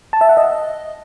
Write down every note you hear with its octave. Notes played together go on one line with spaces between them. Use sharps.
A5
E5
F#5
D#5